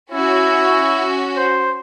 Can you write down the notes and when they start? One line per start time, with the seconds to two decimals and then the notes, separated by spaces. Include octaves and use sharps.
0.12 C#4 E4 F#4
1.37 C5